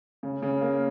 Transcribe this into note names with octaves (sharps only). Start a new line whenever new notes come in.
C#3
C#3
A#3